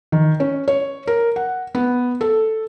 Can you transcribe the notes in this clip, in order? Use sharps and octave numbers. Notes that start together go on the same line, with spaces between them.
D#3
C#4
C#5
A#4
F#5
B3
A4